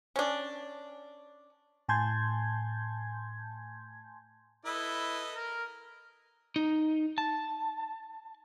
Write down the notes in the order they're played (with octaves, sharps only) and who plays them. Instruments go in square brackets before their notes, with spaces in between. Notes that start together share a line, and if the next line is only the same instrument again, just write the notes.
[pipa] C#4 D4
[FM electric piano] A2 G#5 A5 C6 G6 G#6
[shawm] E4 [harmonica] A4 B4 D#5
[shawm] A#4
[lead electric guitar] D#4
A5